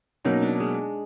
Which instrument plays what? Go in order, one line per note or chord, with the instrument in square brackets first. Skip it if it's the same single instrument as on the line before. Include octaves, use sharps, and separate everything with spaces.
[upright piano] B2 F#3 A#3 C#4 [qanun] D#4
[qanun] D4
G#3